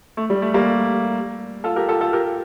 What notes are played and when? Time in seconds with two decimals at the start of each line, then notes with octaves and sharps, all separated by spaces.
0.17 A3
0.30 G3
0.42 A3
0.54 G3 A#3
1.64 F4 A4
1.76 G4 A#4
1.89 F4 A4
2.01 F4 A4
2.13 G4 A#4